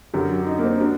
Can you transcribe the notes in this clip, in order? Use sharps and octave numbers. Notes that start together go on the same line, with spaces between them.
F#2 D3 F#3 G4
F#4
D#4
A#3
C4
F#3 D4